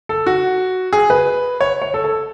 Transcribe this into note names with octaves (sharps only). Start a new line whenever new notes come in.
A4
F#4
G#4
B4
C#5
C#5
A4
A4